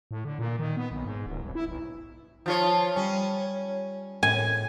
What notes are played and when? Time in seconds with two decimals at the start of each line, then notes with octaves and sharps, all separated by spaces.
0.11 A2
0.25 D3
0.39 A#2
0.59 D#3
0.77 B3
0.92 B1
1.05 G#2
1.26 D1
1.44 C2
1.55 E4
1.68 B1
2.46 F3 F4 C#5 G6 E7
2.96 G3 C#4
3.41 C#5
4.23 A2 G#5